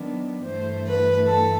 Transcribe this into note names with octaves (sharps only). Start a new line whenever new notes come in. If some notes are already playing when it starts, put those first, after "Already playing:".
Already playing: D#3 F#3 B3 D4
G2 E3 A3 C5
B4
A4